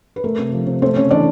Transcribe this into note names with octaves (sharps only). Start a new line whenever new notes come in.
B4
A3 A#4
C3
F3
C3
A3 C4 C5
C#3 C#4 C#5
E3 D4 D5